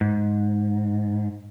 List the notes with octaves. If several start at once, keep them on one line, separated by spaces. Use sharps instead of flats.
G#2